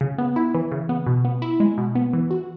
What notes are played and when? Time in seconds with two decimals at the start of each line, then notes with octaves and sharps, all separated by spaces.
0.01 C#3
0.18 B3
0.36 E4
0.55 E3
0.72 C#3
0.89 B3
1.07 B2
1.25 B3
1.42 E4
1.60 G#3
1.78 B2
1.95 B3
2.13 E3
2.31 F#4